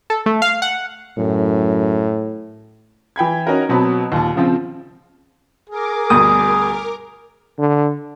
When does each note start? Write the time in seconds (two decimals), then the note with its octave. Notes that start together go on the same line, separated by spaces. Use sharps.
0.10 A4
0.26 A3
0.42 F5
0.62 F#5
1.18 F#2 A2
3.16 E3 G5 B5 G#6
3.47 C#4 D#4 F#4 A#4
3.69 B2 F#3 C4 A5 B5
4.12 D#2 A#2 A5
4.36 C#3 F3 C4 F4
5.70 G#4 A#4 D6
6.10 D2 G2 B2 D#6
7.59 D3